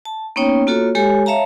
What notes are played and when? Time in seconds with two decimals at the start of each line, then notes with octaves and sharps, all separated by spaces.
0.05 A5
0.36 A#3 B3 C#4 D#4 C#5 G5
0.67 A#3 F4 F#4 A4 C#5
0.95 G#3 G4 A4 C#5 G#5
1.26 C#5 E5 F5 A5 A#5